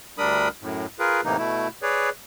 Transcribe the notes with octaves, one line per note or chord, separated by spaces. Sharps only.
D2 G3 D4 A#4 B5 D#6
F#2 A2
F4 G#4 A#4 B4
A2 C3 E3 A#3 D#4
B2 A3 E4
G#4 B4 C#5 D5